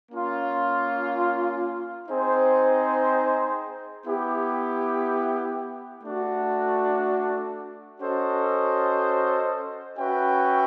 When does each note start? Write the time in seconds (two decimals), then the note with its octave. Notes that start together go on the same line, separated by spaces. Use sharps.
0.12 A#3 C#4 F4
2.09 C4 D#4 G#4 C5
4.06 B3 E4 G4
6.03 A3 D4 F#4
8.00 C#4 F#4 A4 C5 D#5
9.98 C#4 F#4 B4 E5 G5